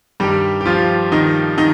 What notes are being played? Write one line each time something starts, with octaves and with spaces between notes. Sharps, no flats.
G2 D#3 G3 G4
G4
F3 F4
D#3 D#4
D#3 D#4